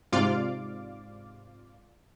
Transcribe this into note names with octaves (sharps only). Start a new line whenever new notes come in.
G#2 C3 F4 D5 F5 D6